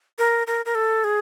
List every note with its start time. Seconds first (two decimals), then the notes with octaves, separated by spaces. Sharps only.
0.19 A#4
0.47 A#4
0.66 A#4
0.75 A4
1.04 G#4